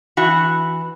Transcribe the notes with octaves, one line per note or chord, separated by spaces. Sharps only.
E3 F#4